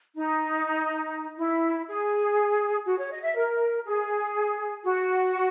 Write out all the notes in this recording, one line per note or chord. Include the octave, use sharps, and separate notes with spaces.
D#4
E4
G#4
F#4
C#5
D#5
E5
A#4
G#4
F#4